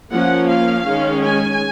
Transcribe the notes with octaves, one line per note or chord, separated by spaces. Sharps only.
F3 A#3 C#4 F#5
F5
D#3 G#3 C#4
G#5